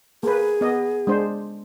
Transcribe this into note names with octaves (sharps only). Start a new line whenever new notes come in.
A#3 G#4 B4
B3 D#5
G#3 D4 C5